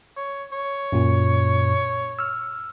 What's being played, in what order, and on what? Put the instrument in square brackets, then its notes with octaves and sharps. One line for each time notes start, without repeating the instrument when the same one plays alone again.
[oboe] C#5
C#5
[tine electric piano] F#2 A#2
E6 F6